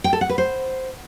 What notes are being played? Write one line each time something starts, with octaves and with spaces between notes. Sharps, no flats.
G5
A4
F#5
B4
C5